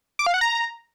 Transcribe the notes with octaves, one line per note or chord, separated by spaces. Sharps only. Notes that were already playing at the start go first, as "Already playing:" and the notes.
D6
F5
F#5
A#5